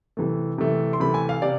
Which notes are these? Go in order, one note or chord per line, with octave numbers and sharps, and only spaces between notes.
C3 E3 A3
C3 E3 A3
C6
C3 E3 A3 B5
G#5
F5
C3 D5